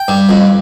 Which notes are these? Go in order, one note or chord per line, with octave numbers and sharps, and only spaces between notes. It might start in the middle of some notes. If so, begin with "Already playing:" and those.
Already playing: G5
G2
F2